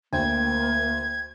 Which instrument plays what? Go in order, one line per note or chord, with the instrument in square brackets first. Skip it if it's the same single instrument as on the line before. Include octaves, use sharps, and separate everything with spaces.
[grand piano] D2 [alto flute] A#3 [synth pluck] C5 G5 [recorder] G#6